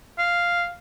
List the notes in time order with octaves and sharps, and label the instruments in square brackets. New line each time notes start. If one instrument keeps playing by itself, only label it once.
[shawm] F5